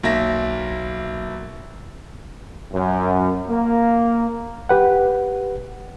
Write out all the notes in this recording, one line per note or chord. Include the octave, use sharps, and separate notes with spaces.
B1 A#3 E5 A#6
F#2
A#3
G4 B4 F#5